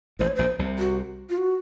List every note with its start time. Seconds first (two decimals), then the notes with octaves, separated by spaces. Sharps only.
0.19 A1 A2 C5
0.27 C#5
0.35 A#1 A#2 C5
0.59 C2 C3
0.79 F#4
1.30 F4
1.38 F#4